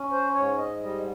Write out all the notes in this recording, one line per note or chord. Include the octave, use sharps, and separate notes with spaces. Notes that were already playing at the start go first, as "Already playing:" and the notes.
Already playing: C#4
C5
G#2 C#5
D#5
G3 D#5